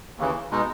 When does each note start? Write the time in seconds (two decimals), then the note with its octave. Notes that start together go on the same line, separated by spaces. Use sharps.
0.18 D#2 C#3 E3
0.51 B2 G#3 D#4